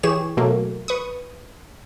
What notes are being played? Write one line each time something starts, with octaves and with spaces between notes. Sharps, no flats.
E3 G4 G#4 C#5 E7
B2 F#3 A3 A#3
B4 C#6 D#6